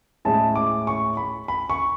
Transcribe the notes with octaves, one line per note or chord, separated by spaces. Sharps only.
A2 G#3 C#4 E4 A5
D6
C#6
B5
B5
C#6